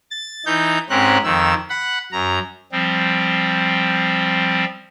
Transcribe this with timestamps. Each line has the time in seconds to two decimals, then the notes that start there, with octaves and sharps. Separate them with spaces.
0.11 A6
0.46 E3 D#4 G6
0.90 G#2 C4 C#4 G4 A#4 F#6
1.24 F2 D#3 E6
1.70 F#5 B5
2.12 F#2 A#5
2.72 F3 G3 C4